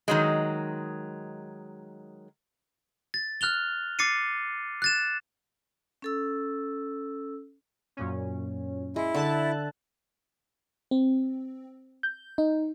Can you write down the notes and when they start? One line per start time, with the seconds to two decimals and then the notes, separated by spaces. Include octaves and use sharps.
0.08 D#3 F#3 G#3
3.14 A6
3.41 F6 F#6 F7 G7
3.99 D6 A6 C7 C#7 D#7
4.82 F#6 A6 E7
6.02 C#4 A4 E6
7.97 F#2 A#2 C#4
8.96 G#3 E4
9.15 D3 E5 A5 F#6
10.91 C4
12.03 G6
12.38 D#4